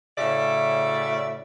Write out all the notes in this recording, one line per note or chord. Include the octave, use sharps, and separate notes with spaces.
A2 C#3 C#4 F#4 D5 E5